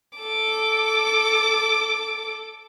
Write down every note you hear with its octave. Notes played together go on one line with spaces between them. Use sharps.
A4 D6